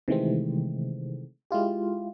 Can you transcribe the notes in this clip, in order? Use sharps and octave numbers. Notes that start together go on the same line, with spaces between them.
C3 D#3 E3 G#3 A3 C4
G#3 E4 F4 G4